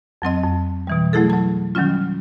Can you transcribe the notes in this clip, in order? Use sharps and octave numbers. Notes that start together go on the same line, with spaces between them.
F2 F#3 C4 D#5
F2
B2 E3 G3
F#3 A3 E4 G#4 A4
F#3 A5
D#3 F#3 G3 C#4 F4